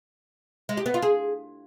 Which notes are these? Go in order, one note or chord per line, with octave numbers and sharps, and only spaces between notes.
G#3
G4
B3
F4
G#4